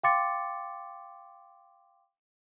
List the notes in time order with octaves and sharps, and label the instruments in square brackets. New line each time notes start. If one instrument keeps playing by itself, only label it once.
[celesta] F5 G5 C6 D6 A6 C#7